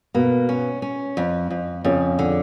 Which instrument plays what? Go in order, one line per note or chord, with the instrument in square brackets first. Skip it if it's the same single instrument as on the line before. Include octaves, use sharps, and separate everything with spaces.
[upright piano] B2 B3 [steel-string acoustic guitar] A#3
[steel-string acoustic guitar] C#4
C#4
F2
F2
[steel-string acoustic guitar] F2 [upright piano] C#3 C#4
[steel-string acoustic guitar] D3